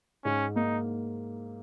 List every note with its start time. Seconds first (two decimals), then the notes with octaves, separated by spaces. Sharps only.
0.24 G#2 C#4
0.56 A#3 D#4